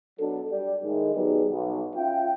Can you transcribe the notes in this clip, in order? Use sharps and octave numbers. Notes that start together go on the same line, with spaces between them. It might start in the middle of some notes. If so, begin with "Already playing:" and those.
B2 F#3 D4 A4
G3 G4 D5
A2 D#3 G#3
F#3 G3 B3 D#4 G#4 B4
B1
C#4 F4 E5 G5